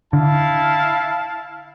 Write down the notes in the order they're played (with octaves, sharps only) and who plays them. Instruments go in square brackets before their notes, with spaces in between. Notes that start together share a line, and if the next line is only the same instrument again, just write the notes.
[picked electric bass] D3 [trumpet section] E4 F5 A5